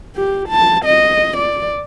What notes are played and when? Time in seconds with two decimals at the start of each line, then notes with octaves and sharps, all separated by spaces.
0.15 G4
0.49 A5
0.85 D#5
1.37 D5